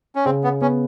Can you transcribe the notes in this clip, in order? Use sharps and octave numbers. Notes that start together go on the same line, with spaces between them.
C#4
C#3 C4
B3
B3 C#4